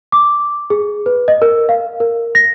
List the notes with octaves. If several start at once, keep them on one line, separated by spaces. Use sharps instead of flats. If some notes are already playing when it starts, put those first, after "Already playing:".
D6
G#4
B4
D#5
A#4
F5
A#4
A#6